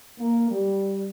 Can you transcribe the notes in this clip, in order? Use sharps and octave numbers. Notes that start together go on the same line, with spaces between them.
A#3
G3